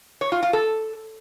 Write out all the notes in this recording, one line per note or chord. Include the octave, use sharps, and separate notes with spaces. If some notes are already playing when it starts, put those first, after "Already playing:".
C#5
F4
F4
A4